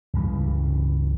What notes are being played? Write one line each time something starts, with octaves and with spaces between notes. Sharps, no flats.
C#2 G2 C#3 E3